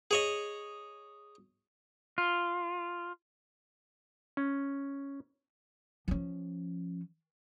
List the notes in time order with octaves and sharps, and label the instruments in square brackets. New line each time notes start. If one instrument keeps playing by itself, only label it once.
[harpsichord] G#4 C#5 D#5
[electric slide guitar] F4
[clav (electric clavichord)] C#4
[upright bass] F3 C#4